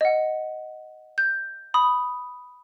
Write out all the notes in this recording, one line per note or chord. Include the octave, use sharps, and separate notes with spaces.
D#5 F#5
G6
B5 D#6